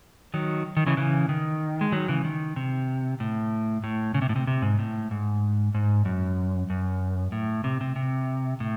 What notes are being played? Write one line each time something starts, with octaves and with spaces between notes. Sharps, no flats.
D#3 F#3
D#3
C#3 E3
C#3 E3
D#3
G#3
D#3 F#3
C#3 E3
D#3
C3
A2
A2
C#3
C3
A2
C3
C3
G#2
A2
G#2
G#2
F#2
F#2
A2
C3
C3
C3
A2